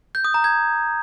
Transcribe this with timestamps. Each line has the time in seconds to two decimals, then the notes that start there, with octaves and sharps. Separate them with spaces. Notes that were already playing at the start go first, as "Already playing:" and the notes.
0.15 G6
0.25 D#6
0.34 A#5
0.44 G#6